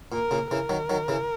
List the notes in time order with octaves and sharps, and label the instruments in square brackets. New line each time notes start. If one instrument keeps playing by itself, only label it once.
[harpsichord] A#2 [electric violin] A#4
[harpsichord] A#2 C#3
[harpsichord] C#3 E3 [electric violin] A#4
[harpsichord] D#3 F#3
D#3 F#3
C#3 E3